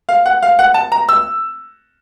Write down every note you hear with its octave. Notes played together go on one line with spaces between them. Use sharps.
F5
F#5
F5
F#5
A5
A#5
E6